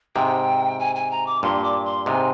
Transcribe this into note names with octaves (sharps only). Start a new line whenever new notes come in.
G#2 C3 G5
G#5
G#5
A#5
D6
G2 A#2 C6
D6
C6
G#2 C3 G#5